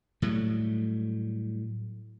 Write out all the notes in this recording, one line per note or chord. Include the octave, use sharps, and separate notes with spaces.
A2 F#3 G3 A3